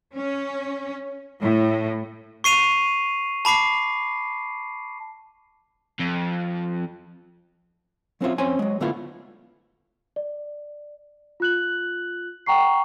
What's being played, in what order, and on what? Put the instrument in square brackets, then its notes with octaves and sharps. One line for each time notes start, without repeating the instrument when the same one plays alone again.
[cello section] C#4
A2
[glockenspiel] C#6 C7 D#7 F7
A5 B5 D6 C7
[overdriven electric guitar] F2
[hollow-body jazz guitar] F#3 C4 C#4 F4 E5
F2 C4 C#4 G#5 C6
F#3 G#3
D3 A3 B3 E4 F4
[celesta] D5
F4 F#6 F#7
F#5 G5 A#5 C#6 C7